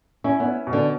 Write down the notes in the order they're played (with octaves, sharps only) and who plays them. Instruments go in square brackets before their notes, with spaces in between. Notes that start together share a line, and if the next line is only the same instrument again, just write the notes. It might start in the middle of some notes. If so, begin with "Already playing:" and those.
[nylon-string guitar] C#4 [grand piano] E4
[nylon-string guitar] B3
[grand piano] C#4
B2
[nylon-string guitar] D3